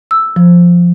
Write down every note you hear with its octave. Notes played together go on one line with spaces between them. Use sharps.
E6
F3